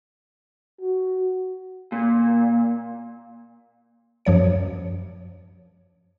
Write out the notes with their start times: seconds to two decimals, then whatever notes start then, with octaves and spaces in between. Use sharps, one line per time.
0.81 F#4
1.92 A#2
4.25 F#2 F3 C#5 C#7